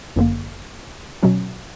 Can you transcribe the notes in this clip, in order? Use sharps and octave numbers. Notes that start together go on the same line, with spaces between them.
G1 F#2 D3 A#3
B2 F#3 C#4